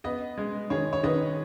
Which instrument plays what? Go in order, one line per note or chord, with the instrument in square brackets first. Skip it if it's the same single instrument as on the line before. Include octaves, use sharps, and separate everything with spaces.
[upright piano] B3 B4 D#5
G#3
D#3 G#4 C#5
C#5
D#3 B4 D#5